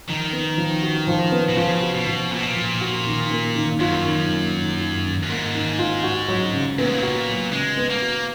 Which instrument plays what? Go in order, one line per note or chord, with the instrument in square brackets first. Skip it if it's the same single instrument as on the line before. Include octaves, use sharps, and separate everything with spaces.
[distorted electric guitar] D#3 [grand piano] F3
[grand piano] B3
F3
F#4
F3
B3
[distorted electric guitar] B2
[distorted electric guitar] C#3 [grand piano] F3
[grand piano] F#4
[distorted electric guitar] B2
[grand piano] F3
[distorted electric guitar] A#2 [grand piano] B3
[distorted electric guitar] B2
A#2
[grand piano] F3
F#4
D#3
A#3
D#3
[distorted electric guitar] F#2 [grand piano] F4
[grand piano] D#3
A#3
D#3
F4
D#3
[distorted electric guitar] F#2
[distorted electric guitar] G#2 [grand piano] A#3
[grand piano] D#3
F4
F#4
F#3
C#3
[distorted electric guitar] A#2 [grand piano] B3
[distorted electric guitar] G#2
A#2
[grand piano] F#4
F#3
[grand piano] C#3 [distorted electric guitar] G#3
[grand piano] B3
[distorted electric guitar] A#3
[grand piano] F#4